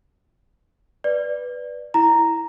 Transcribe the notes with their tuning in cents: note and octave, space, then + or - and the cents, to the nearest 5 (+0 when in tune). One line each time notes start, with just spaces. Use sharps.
B4 +0 D5 +0
E4 +0 A#5 +0